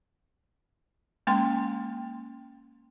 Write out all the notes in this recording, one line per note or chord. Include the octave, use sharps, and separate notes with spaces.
G#3 A#3 C#4 G5 C6